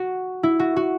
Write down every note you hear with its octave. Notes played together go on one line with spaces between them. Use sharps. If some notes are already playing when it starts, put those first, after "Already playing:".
Already playing: F#4
E4
F#4
F#4